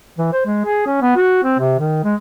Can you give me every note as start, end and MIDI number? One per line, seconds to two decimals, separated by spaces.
0.18 0.28 52
0.32 0.42 72
0.46 0.64 56
0.65 0.82 68
0.86 0.97 61
1.02 1.15 59
1.16 1.39 66
1.43 1.54 60
1.59 1.76 48
1.79 2.03 51
2.04 2.15 56